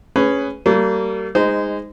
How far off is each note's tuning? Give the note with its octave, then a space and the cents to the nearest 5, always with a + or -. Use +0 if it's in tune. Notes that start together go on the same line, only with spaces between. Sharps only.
C#4 +0 G#4 +0 B4 +15
G3 -35 A#3 -35
G#3 -20 D#4 +0 C5 -25